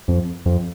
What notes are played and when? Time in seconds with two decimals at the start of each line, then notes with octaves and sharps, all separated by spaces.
0.08 F2
0.46 F2